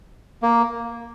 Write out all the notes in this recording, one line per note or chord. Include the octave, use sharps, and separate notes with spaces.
A#3